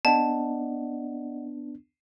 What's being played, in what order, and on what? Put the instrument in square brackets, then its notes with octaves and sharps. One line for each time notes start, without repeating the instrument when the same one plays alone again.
[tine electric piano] B3 D4 [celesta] D5 D#5 F#5 [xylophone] A5